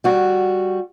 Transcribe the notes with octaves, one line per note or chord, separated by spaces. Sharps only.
G3 F#4